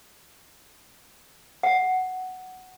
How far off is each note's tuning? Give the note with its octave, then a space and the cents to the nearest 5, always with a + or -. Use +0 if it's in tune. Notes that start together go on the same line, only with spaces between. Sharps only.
F#5 +5